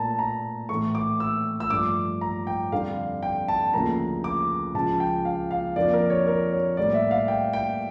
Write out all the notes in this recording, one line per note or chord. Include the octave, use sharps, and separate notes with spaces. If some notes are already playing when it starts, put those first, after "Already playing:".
Already playing: A#2 A3 A5 A#5
A#5
A2 E3 A3 C#6
D6
E6
E6
G2 F3 A3 D6
A#5
G5
F2 D3 G3 F5
G5
A5
D2 C#3 F3 A#3 A#5
D6
C#2 C#3 F3 A5
G5
F5
F5
F2 D3 F3 A#3 D5
A#4
C#5
A#4
C#5
A2 G3 A#3 D5
E5
F5
G5
G5